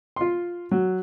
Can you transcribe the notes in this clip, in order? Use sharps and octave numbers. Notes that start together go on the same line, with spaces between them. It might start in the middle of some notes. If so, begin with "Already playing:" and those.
F4 C6
F#3